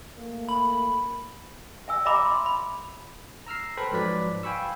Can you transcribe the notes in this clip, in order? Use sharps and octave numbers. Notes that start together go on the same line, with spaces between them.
A3 A#3
B5
E5 G#5 E6
D#5 E5 G#5 A#5 B5 D6
C6
B5
A#5 E6 F6 C7
A4 B4 C5 G5 B5
G#2 F3 F#3 B4 D5 B6
F5 G5 G#5 B5 C#6 E6